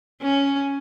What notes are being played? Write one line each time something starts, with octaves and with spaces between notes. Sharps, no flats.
C#4